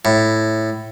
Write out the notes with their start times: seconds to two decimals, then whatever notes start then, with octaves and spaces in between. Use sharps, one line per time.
0.05 A2